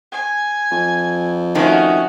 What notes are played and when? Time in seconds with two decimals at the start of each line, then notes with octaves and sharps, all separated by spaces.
0.12 G#5
0.71 F2
1.55 D#3 A3 C#4 D#4 F#4